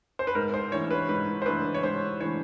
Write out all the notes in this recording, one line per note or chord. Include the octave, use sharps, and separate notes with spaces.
C5
B4
G#2 A#4
C5
E3 A3 D4 C#5
B4
G#2 B4
C5
E3 A3 D4 B4
C#5
G#2 C5
E3 A3 D4 C#5